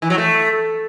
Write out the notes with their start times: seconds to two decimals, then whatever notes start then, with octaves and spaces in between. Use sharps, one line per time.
0.02 E3
0.10 F#3
0.18 A3